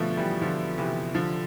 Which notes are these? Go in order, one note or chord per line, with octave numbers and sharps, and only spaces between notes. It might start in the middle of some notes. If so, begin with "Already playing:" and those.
Already playing: B2 D3 F3 A3
E3 G3
D3 F3
C3 E3
D3 F3